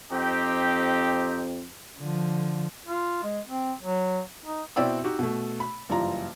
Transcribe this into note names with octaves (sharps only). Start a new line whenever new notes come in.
F2 C4 D#4 G4
D3 F3
F4
G#3
C4
F#3
D#4
B2 C4 E4 D5 G5 E6
D#4 F#4 G4
B2 A3
B5
F#1 G2 E3 F3 F4 A#5